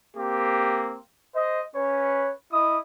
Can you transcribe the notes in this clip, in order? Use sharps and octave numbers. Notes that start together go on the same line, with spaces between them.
A#3 C4 G4
C5 D#5
C#4 B4 C#5
E4 D#5 D#6